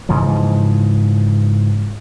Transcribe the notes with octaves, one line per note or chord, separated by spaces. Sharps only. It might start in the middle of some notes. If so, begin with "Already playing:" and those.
G#2 C#3 E3 F3